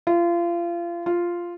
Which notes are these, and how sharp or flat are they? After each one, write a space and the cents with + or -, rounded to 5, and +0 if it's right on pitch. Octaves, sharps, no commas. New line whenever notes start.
F4 -30
F4 -5